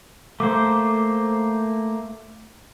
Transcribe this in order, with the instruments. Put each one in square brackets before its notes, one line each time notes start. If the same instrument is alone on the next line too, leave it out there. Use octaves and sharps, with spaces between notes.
[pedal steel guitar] A3 A#3 C5 [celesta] D6